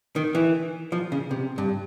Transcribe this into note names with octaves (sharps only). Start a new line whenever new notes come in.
D#3
E3
F3
C#3
C3
G2